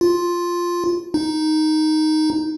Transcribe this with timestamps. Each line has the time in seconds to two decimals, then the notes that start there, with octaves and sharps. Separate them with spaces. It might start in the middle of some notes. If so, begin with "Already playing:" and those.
0.01 F4
1.14 D#4